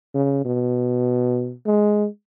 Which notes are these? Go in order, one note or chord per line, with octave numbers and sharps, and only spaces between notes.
C#3
B2
G#3